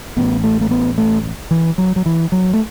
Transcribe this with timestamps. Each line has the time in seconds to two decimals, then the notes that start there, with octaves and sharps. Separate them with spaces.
0.17 A1 A2 B3
0.44 A3
0.61 A3
0.71 B3
0.98 A3
1.51 E3
1.78 F#3
1.96 F#3
2.06 E3
2.32 F#3
2.54 A3